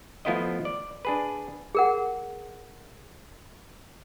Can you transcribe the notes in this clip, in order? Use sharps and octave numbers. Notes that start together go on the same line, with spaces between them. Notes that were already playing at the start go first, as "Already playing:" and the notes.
F3 A3 B3 E4 F4 D#5
D5
D4 G#4 B4
G#4 A#4 F#5